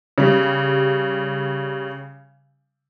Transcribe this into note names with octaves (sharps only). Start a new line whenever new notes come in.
C#3 G3